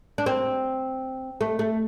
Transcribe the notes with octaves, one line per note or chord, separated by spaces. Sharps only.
D4
C4
A3
A3